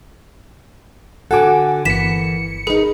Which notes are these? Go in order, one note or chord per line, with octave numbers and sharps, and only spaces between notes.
D3 F#4 A4 F#5 G#5 D6
G1 E3 A#3 B3 B6 C#7 E7
D#4 G#4 A#4 B4